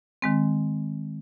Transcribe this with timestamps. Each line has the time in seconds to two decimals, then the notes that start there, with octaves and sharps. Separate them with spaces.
0.22 D#3 G#3 C4